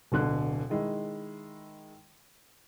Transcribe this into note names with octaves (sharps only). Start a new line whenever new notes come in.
D1 B2 D3 F#6
D#3 G#3 E4